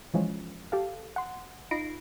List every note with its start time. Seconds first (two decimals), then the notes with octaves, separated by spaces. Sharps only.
0.14 E3 F3 G#3 C#4
0.72 G4 A4 F5
1.16 F#5 C6
1.71 D#4 F4 B5 A#6 C7 D7